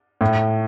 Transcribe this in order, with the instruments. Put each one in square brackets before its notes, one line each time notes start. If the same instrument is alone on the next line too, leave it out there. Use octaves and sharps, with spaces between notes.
[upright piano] A2